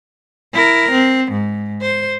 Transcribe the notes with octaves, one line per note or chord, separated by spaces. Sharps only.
E4 A#4
C4
G#2
C5